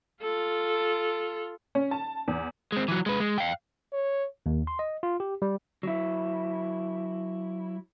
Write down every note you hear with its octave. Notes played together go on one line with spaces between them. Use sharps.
F4 A4
C#4
A5
E2
G#3 C4
E3 F#3
G#3 B4
G#3
F5 G5
C#5
D#2
C6
D#5
F4
G4
G3
F#3 E4